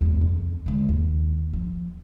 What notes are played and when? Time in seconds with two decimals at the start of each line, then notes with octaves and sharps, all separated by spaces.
0.01 E2 G#3
0.21 F2
0.66 D3 G#3
0.89 D#2
1.53 F3